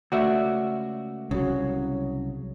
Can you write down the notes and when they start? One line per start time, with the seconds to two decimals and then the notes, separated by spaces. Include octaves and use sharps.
0.12 C#2 A3 F#4 D5 E5
1.31 C2 C#3 F#3